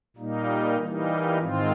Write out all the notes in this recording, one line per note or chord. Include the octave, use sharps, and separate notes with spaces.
A#2 G3 A#3 D#4
E3 G3 A#3 D#4
G#2 D#3 G#3 C4 F4